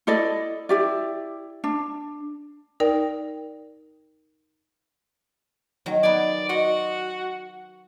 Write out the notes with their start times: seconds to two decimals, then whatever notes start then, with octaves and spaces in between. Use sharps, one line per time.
0.07 E4 A4 D5 D#5
0.69 E4 G4 D5
1.64 D4
2.80 D#4 A#4 D5 G5
5.86 D#3 F#3
6.03 B3 D5 G#5
6.49 F#4 D#5 C6